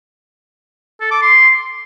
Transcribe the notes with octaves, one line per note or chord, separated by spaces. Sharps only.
A4
D6
C6